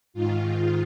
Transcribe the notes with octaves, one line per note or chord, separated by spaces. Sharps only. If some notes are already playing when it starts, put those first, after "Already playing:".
G#2 D#3 F4